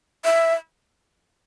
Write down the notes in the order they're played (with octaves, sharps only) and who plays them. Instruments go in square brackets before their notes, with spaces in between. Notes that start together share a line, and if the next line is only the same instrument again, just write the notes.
[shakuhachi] E5